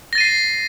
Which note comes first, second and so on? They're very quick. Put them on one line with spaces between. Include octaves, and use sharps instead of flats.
A#6 A6 D#7 C7